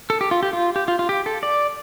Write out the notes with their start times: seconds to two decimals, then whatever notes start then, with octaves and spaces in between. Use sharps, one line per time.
0.10 A4
0.21 G4
0.31 F4
0.43 G4
0.53 F4
0.76 G4
0.88 F4
0.99 F4
1.09 G4
1.26 A4
1.43 D5